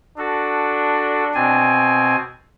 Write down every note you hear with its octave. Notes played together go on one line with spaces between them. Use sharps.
D4 F#4 A4
B2 C4 G#5